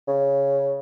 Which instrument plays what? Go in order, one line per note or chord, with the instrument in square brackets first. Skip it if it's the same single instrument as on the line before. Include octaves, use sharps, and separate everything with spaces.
[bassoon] C#3